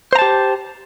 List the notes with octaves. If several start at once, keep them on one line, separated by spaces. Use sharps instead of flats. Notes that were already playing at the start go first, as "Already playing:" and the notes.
G4 C5 A5 A#5